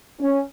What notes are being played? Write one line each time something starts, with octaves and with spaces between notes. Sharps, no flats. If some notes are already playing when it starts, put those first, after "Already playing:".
C#4